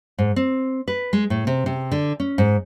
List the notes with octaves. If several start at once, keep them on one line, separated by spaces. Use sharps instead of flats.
G#2
C4
B4
G#3
A2
C3
C3
D3
C#4
G#2